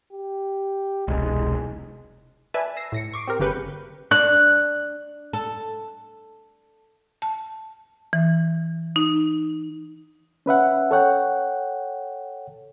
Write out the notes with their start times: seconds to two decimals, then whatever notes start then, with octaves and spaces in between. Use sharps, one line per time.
0.12 G4
1.08 E1 C2 G#3
2.54 B4 D5 E5 G#5 A5
2.77 E6 A#6 C7
2.92 A2 A#6 C#7
3.14 C#6 D6 C7 D7
3.27 C4 G4 A#4
3.40 G1 C#3 G4 B4 G6 C#7
4.11 D4 F#6
5.33 A4
7.22 A5
8.13 E3
8.96 D#4
10.46 C#4 B4 E5 F#5
10.91 A4 C#5 F#5 G5